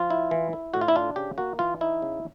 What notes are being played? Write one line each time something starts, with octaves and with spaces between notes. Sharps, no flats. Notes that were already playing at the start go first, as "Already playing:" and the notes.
Already playing: F3 F4
E4
E3
E4
A2 F#4
F4
E4
D4 F4
C#3 G4
A#3 F#4
E3 F4
D#4 E4
C#3